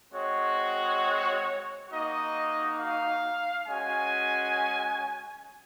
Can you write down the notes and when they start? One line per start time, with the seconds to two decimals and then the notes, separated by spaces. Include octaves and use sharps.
0.13 G#3 C4 F#4 C#5
1.90 A#3 D#4 F#4 D#5
2.79 F5
3.67 G#3 C#4 F#4 G#5